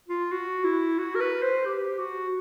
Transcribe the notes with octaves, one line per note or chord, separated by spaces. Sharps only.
F4
F#4
E4
F#4
A#4
B4
C5
G4
F#4